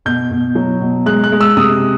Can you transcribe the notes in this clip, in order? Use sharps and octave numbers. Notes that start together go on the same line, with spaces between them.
B2 G6
B2
F#3
B2
G#3 F#6
F#6
G#3
E6
C3 D#6